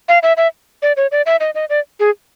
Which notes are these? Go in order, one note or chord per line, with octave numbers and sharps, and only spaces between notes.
F5
E5
E5
D5
C#5
D5
E5
D#5
D#5
D5
G#4